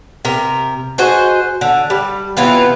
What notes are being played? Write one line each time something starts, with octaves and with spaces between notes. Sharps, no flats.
C3 A#4
F#4 G#4 C5 D#5
D3
G3
C3 E3 B3 F4